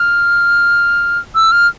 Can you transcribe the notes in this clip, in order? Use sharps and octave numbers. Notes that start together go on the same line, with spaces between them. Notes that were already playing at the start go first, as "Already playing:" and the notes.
Already playing: F6
E6
F6